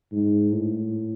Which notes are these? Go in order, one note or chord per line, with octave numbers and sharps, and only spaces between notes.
G#2
A2